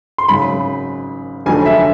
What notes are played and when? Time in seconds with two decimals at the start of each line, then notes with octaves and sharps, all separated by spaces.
0.18 C6
0.28 G#1 F#2 C#3 B5
1.46 F1 F2 D3 F#3 G#5
1.66 E5